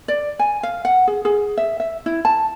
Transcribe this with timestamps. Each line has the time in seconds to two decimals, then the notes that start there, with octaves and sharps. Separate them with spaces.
0.08 D5
0.39 G#5
0.63 F5
0.85 F#5
1.07 G#4
1.25 G#4
1.58 E5
1.80 E5
2.06 E4
2.25 A5